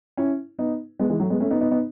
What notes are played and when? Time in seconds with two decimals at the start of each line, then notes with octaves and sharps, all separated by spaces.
0.17 C#4 E4
0.59 B3 D#4
0.99 G#3 B3
1.10 E3 G#3
1.20 F#3 A3
1.30 G#3 B3
1.40 A3 C#4
1.51 B3 D#4
1.61 B3 D#4
1.71 B3 D#4